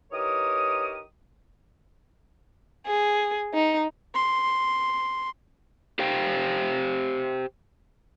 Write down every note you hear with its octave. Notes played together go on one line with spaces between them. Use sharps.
E3 D#4 G4 A#4 C#5 D#6
G#4
D#4
C6
G4 C5 F5 G5